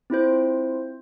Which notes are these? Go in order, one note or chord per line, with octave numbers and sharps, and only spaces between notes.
C4 E4 F4 C5